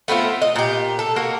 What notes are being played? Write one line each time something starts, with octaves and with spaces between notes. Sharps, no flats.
A3 B3 C4 F4
D#5
A#2 G4
A4
A#3 F#4 A#4